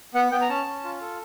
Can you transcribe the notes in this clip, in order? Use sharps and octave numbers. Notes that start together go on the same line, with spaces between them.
B3 F#5
B3 G5
A#5
C#4 A5
C#4
F4
A4